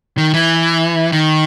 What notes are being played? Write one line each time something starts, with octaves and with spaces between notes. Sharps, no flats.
D#3
E3
D#3